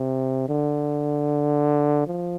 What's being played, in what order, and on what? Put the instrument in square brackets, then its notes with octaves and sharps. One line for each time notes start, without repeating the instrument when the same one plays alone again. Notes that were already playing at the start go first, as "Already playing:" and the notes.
Already playing: [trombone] C3
D3
F3